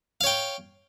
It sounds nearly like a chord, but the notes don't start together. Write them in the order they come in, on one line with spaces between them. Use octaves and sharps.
F5 C#5 G5